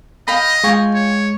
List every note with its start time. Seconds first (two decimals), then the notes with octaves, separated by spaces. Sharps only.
0.28 D#5 F5 G5 B5
0.64 G#3 F4 G5 G#5 C#6
0.94 C#5